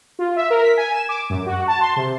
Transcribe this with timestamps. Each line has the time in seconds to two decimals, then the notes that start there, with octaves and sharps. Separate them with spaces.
0.19 F4
0.36 E5
0.50 A#4
0.62 B6
0.77 G#5
0.94 E7
1.09 D6
1.30 F#2
1.46 F#4
1.68 A5
1.81 C6
1.96 C3